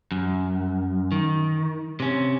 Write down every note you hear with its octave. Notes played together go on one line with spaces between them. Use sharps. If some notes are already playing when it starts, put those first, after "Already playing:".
F#2
D#3
C3 C#4